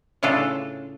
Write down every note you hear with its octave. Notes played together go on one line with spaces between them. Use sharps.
A2 C#3 D4 F4 A4